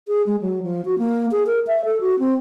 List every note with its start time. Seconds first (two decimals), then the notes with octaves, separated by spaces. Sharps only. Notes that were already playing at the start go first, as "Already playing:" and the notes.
0.08 G#4
0.26 G#3
0.41 F#3
0.63 F3
0.85 F#4
0.98 A#3
1.31 G#4
1.47 A#4
1.67 E5
1.85 A4
2.01 F#4
2.19 C4